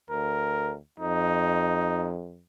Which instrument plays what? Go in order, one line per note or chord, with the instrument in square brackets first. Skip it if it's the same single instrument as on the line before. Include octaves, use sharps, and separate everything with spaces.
[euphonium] D2 [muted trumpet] A#4
[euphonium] F2 [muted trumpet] D#4